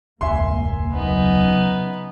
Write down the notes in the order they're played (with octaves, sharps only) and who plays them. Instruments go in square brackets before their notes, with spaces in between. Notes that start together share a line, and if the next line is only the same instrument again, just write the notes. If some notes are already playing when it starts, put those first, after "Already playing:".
[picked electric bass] E1 C#2 [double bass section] G2 A#3 [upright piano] E5 G#5 C6
[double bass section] C#3 F#3 [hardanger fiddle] B3 D#4